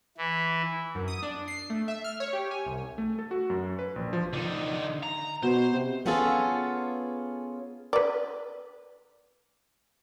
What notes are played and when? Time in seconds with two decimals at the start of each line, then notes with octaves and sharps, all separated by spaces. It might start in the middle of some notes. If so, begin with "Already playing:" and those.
0.18 E3
0.95 F#2
1.08 D#6
1.23 D4
1.48 C7
1.70 A3
1.88 E5
2.04 F6
2.20 C#5
2.33 G4
2.51 G#5
2.66 C2
2.98 A3
3.19 A4
3.31 F#4
3.50 F#2
3.79 B4
3.96 A#1
4.13 F3
4.33 D3 D#4
5.03 A#5
5.43 B2 C5
5.74 C3
6.06 B3 C#4 F4 G#4 A4
7.93 B4 D5